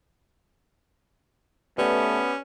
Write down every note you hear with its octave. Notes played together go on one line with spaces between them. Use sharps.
A3 B3 C#4 G4 B4 D5